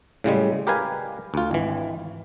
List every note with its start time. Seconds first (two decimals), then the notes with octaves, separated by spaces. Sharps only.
0.24 A2 C#3 G3 G#3
0.67 G4 A#4 B4 F5 G#5
1.34 D2 F4
1.51 G#1 E3